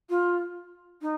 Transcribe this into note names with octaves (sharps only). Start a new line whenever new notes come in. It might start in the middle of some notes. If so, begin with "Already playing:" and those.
F4
D#4